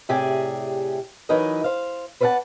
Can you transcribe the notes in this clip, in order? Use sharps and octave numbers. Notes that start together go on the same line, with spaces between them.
A2 C3 G4 G#4 D5 G#5
E3 F#3 D#4 A#4 B4 D#5
C5 F5
B4 C5 D5 F5 F#5 A5